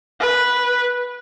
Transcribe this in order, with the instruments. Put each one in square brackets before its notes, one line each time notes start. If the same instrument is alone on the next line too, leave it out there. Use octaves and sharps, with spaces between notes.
[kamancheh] B4